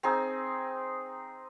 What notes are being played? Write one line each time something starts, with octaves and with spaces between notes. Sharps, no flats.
C4 D#4 G#4